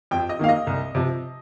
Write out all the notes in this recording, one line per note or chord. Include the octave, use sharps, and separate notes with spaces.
F2 G5
D#5
D#3 A#3 F5
D#5
C2
C3 F3